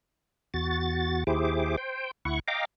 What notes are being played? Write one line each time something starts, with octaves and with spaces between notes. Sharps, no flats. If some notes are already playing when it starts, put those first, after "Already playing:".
E2 F#4 A6
D#2 E4 G4 G#4 C5 D6
C5 G5
D2 E4 F#5 C#6
D#5 F5 G5 A#5 D6